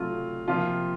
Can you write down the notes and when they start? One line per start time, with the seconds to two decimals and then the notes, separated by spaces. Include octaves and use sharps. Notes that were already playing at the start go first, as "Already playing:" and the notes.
Already playing: C3 F#3 A3 F4
0.48 C3 F3 A#3 F4